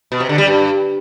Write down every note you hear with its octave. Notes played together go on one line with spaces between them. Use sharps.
B2
C3
D3
G3
G2